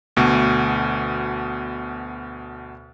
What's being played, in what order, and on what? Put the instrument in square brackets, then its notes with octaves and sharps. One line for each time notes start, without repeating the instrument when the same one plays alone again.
[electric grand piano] D2 B2